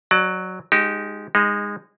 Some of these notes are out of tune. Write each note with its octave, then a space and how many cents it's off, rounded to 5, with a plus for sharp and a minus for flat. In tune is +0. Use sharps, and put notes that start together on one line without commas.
F#3 +0 D5 +30
G#3 +0 D#4 +0 G4 -25
G#3 -20 D#4 +0